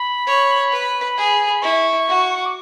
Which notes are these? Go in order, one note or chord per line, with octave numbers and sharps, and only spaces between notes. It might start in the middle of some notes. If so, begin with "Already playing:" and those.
Already playing: B5
C#5
B4
G#4
B5
E4 C#6
F#4
D6